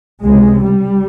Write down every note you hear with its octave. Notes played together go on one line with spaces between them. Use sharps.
C#2 C3 G#3
G3